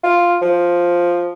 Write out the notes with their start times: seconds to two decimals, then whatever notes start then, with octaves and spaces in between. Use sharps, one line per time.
0.03 F4
0.42 F3